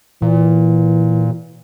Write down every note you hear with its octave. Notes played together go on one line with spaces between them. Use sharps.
A#2 E3